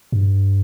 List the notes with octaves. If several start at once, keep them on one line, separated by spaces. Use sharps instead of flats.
G2